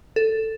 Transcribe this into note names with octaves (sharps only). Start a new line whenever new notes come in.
A4